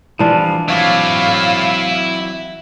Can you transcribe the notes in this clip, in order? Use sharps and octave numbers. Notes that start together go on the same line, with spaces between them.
E3 F3 G3 D4 F4
F#3 C4 E4 C#5 D5 F5